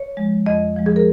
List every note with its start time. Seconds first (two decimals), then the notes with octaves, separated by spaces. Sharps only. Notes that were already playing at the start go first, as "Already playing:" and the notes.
Already playing: C#5
0.17 F3 G#3
0.46 F2 D#5
0.77 F3 G#3
0.86 G#4
0.96 A#4